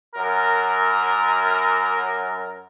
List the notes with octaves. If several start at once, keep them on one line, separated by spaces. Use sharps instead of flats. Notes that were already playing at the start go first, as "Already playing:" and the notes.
F#2 A#4